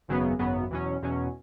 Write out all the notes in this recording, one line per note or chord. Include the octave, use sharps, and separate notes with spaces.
G#1 F#2 C#3 F#3 B3
G#1 F#2 C#3 F#3 B3
E2 B2 F#3 C#4
E2 B2 F#3 C#4